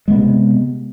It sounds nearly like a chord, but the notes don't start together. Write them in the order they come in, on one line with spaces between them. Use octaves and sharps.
G#3 B3 C3